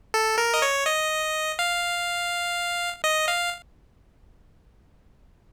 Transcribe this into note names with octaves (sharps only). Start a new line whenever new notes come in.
A4
A#4
D#5
C#5
D#5
F5
D#5
F5